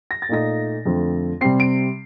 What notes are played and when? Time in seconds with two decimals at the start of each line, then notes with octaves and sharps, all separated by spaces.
0.11 A#6
0.22 A6
0.29 A#2 A3 D#4 A#6
0.85 F2 D3 A3 C4
1.41 C3 G3 C4 C7
1.60 D7